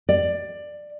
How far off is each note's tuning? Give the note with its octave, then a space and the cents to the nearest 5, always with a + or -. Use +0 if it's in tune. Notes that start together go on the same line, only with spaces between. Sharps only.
D5 +15